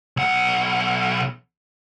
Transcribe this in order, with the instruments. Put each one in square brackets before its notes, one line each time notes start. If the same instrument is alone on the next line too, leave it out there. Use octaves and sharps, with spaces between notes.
[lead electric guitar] B1 F#5